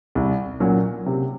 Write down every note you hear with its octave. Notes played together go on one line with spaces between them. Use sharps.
C2
A#2 F#3 C#4
C3